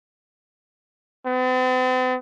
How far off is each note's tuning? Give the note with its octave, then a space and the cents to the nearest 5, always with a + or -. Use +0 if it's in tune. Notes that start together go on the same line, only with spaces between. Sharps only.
C4 -45